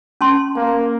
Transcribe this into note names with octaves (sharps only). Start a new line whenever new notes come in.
C#4 A5 C6
A#3